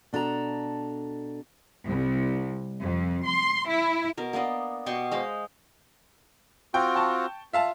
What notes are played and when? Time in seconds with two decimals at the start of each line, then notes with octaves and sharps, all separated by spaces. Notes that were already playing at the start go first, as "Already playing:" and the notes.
0.13 B2 D4 A4 A#4 A#5
1.85 C2
2.82 F2
3.25 C6
3.68 E4
4.17 B2 A#4
4.33 A#3 B3 D4 D#5
4.86 B2 G4 C6 C#6
5.11 G#3 C5 D#5 F5
6.74 C4 F4 F#4 G5
6.95 G5 A5 C#6
7.53 F4 E5 F5 A5